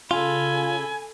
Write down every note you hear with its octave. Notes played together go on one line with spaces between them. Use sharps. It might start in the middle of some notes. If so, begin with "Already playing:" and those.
C#3 F4 A4 G#5 B5